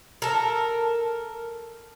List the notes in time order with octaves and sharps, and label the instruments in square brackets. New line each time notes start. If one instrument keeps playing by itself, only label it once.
[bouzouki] A4 A#4